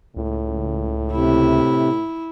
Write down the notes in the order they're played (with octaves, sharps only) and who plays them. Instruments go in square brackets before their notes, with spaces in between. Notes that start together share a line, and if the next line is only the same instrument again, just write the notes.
[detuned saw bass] C#2 [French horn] A2
[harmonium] C3 [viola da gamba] E4